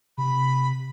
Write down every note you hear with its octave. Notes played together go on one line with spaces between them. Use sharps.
C3 B5